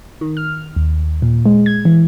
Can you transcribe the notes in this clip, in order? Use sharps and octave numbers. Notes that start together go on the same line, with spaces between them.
D#3
F6
D#2
A#2
G#3
G#6
E3